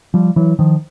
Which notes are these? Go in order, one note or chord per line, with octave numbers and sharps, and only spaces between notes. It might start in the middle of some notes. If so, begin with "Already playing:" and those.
F3 G3
E3 F#3
D#3 F3